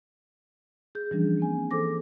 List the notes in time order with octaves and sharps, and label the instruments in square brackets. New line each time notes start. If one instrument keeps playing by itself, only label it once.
[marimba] G#4 G6
E3 F3 G3 C#4 D4
A#3 C4 G#5
E3 G#4 A4 C5 D6 A#6